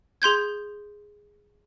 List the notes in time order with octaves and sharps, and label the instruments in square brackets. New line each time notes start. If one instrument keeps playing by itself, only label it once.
[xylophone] G#4 C6 G6 G#6